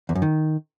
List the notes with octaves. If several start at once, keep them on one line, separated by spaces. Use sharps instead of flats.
E2
F#2
D#3